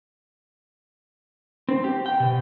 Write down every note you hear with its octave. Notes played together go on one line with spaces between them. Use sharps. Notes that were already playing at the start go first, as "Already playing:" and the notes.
C4
G4
G5
B2